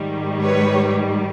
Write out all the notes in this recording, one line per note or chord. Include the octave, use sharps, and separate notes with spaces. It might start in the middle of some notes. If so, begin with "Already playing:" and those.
Already playing: G#2 D#3 G3
B4 C#5